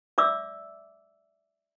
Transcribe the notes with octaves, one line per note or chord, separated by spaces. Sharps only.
D5 E5 D6 E6